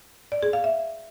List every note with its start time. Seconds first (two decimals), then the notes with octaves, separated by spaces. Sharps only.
0.32 D5
0.43 G#4
0.53 F5
0.64 E5